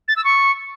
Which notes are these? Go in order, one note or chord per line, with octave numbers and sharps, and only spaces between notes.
A6
E6
C#6